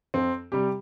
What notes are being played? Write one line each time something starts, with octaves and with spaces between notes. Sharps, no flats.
F2 C4
C3 G3 G4